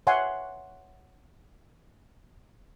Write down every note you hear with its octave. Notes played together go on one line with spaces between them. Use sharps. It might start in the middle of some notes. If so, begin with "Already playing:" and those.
C#5 E5 F#5 G#5 C6